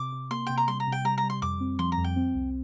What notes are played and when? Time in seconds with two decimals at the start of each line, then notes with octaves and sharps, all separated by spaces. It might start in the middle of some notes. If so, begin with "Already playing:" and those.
Already playing: C3 D6
0.12 C3
0.31 A#3 C6
0.47 C3 G5
0.57 A#5
0.68 G3 C6
0.80 A#5
0.87 C3
0.92 G5
1.04 G3 A#5
1.18 A#5
1.23 G3
1.30 C6
1.42 F2 D6
1.60 C4
1.79 F3 C6
1.92 A#5
1.98 F2
2.04 G5
2.16 C4
2.35 C2